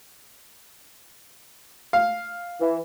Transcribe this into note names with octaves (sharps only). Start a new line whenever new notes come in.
F5
E3